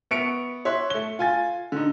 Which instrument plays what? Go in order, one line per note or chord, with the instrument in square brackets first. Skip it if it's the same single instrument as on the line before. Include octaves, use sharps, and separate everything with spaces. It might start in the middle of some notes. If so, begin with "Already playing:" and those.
[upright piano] B3 E5 C#6 C#7 D7 F7
C#5 E5 C6 F#6
A3 G7
F4 G#5 A6
D3 D#4